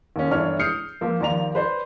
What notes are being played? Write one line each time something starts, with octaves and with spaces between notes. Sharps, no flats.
D#2 C#4
G1 E3 D4 C#5 F6
D#6 F6 G6 C7 C#7
F3 A#3
D#2 F3 D5 A#5 F7
B4 C5 D5